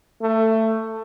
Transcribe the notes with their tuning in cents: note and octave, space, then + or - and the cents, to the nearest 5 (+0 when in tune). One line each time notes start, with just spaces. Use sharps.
A3 +15